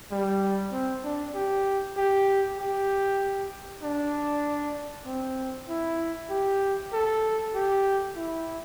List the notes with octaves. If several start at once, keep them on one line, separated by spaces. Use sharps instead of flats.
G3
C4
D4
G4
G4
G4
D4
C4
E4
G4
A4
G4
E4